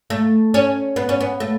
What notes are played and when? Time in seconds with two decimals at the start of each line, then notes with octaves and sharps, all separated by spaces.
0.10 A3
0.54 C#4
0.96 B3
1.09 C#4
1.21 B3
1.40 A3